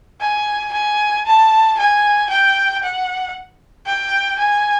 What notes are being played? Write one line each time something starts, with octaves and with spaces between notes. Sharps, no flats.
G#5
G#5
A5
G#5
G5
F#5
G5
G#5